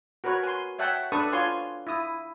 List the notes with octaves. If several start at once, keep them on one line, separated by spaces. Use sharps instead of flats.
F#4 A#4 B4 C#5
G#5 C6
C#5 E5 F#5 G5 A5
D4 A4 B4 A5 C#6 D#6
F4 C#5 G#5 C6
E4 D#6